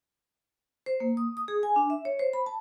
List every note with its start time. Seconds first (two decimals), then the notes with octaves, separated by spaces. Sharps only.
0.86 C5
1.00 A#3
1.17 D#6
1.37 D#6
1.48 G#4
1.63 G#5
1.76 D4
1.90 E5
2.05 C#5
2.19 C5
2.33 B5
2.46 A5